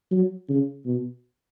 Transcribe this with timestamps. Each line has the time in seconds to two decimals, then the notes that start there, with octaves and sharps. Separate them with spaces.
0.11 F#3
0.49 C#3
0.86 B2